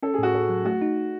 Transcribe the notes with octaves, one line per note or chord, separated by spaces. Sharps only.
C#4 A4
G#4
A2 F#4
A2 A4
F#3
A3 F#4
D#4